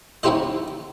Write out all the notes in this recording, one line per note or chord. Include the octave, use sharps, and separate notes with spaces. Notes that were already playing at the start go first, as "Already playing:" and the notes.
C#4 D#4 E4 G4 C5 D#5